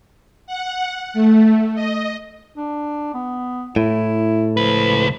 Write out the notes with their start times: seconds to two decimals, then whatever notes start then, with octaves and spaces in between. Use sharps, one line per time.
0.47 F#5
1.14 A3
1.75 D#5
2.56 D4
3.14 B3
3.76 A2 E4
4.57 C#2 F3 B4